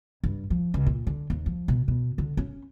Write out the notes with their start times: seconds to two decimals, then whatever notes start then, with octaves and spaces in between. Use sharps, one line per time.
0.24 G2
0.50 F3
0.74 C#2
0.86 A#2
1.07 D3
1.30 D#2
1.46 F3
1.68 B2
1.88 B2
2.18 D3
2.37 C#4